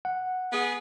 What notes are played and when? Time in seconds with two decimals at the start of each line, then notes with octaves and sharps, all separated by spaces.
0.05 F#5
0.52 B3 G#4